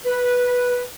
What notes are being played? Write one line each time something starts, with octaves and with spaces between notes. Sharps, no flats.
B4